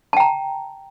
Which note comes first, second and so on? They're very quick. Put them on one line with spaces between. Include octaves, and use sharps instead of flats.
A5 G5 A#5